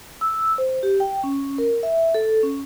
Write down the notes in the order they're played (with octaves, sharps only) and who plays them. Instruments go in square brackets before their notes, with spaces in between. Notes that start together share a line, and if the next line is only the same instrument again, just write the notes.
[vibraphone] E6
C5
G4
G5
C#4
A#4
E5
A4
C#4